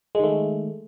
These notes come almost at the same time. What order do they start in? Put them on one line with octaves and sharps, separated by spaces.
G#3 D#3 A3